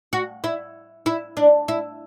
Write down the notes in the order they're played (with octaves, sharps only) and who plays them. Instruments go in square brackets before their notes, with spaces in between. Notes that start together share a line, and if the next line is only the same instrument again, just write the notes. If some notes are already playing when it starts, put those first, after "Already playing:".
[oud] F#4
E4
E4
D4
E4